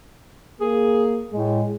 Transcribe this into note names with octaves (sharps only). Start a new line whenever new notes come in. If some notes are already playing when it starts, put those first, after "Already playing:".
A#3 G#4
A2 G#3